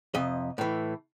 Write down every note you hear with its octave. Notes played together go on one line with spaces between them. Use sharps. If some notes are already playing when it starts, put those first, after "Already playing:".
F2 C3 D#5
A2 E3